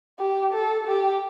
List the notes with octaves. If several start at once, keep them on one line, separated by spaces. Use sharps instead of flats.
G4
A4
G4